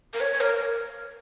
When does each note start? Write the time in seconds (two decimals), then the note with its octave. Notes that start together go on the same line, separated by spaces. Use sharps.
0.14 A#4
0.21 C#5
0.41 A#4